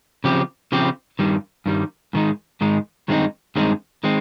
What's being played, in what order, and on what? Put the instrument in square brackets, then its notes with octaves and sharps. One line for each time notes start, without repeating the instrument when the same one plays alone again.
[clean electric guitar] C#3 F3 C4 G4
C#3 F3 C4 G4
G2 D#3 G3
G2 D#3 G3
G#2 D#3 G#3 D#4
G#2 D#3 G#3 D#4
G2 D#3 G#3 C4 D#4
G2 D#3 G#3 C4 D#4
D#3 G#3 C4